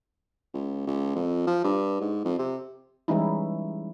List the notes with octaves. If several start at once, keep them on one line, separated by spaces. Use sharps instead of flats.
C#2
C#2
F2
F3
G2
G#2
F2
C3
E3 G3 G#3 C#4 D#4 E4